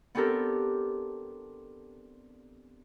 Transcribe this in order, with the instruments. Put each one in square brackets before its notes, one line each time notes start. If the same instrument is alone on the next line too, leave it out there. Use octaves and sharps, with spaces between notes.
[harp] B3 C4 D4 G4 A4 A#4